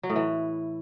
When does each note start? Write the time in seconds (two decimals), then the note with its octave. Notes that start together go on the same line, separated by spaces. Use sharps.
0.03 F#3
0.10 A2
0.16 E3